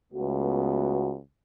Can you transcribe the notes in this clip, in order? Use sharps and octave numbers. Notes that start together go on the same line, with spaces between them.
C#2 A3 B3 F#4